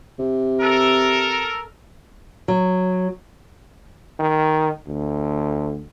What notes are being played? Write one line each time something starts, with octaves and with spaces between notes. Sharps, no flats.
C3
A4 A#4
F#3
D#3
D2